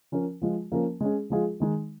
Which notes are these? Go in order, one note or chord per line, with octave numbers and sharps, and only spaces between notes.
F3 C#4 A#4
F3 G#3 F4
F3 A#3 C#4 A#4
G#3 C#4 G#4
F3 G#3 F4 G#4
D#3 G#3 D#4